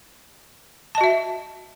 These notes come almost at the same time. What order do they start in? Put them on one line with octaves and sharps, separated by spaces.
A5 D#5 F#4 E5